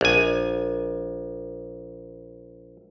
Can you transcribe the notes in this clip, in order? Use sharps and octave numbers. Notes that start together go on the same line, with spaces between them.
A#1 G#5